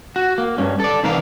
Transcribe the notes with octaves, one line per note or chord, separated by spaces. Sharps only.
F#4
A#3
G2 C#4
A4 D5
C2 D#3 E3 B3 A#4 F5